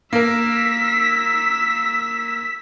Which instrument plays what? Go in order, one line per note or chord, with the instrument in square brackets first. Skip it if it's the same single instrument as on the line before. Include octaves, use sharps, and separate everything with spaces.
[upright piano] A#3 A#4 [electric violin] E6 B6